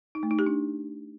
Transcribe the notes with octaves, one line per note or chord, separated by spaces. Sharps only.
D#4
A3
D#4
G4
D4